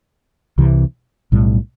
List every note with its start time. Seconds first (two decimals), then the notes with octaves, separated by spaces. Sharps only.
0.58 C2 C3 E3
1.32 B1 A2 G3